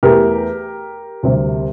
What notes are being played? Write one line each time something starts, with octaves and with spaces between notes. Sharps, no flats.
E2 E3 A3 G4 A#4
D2 C3 G3 C4